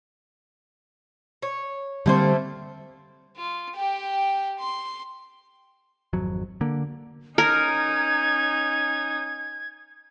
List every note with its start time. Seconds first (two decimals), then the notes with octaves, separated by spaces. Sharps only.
1.42 C#5
2.06 D3 G3 A3 A#3 C4 C5
3.37 F4
3.76 G4 G5
4.60 C6
6.13 G#1 F2 F#3
6.61 D3 A#3
7.38 C#4 D#4 A#4 G#6